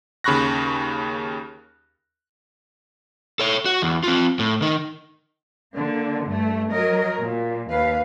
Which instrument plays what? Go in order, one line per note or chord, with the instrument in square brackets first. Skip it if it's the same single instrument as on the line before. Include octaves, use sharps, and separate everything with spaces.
[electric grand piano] D#2 C#3 B5 C#6 F#6 A#6
[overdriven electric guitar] A4 C#5
F#4
E2
C4 F4
A2
D#3 D#4
[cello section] D3 A#3
G2 A3
F#3 A#4 D#5
A#2
D#2 B4 F5